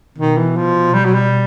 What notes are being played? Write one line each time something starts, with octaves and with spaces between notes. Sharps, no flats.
B2 D#3
E3
F3
G3
F#3
G3